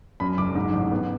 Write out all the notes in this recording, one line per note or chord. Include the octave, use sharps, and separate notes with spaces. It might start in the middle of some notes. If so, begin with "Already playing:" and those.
F#2 B5
F#1 D6
G#2
A1
B3